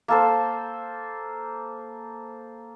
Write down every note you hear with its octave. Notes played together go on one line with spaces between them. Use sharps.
A#3 A4 C5